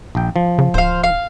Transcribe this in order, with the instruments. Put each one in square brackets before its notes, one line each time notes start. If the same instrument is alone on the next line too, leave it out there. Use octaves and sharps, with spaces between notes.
[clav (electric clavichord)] A#1 G5
F3
[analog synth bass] C#3
[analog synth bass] D1 [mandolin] C5 F5
[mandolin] F5